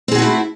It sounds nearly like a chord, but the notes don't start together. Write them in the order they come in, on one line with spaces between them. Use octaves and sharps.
C4 G#4 F#4 A3 E4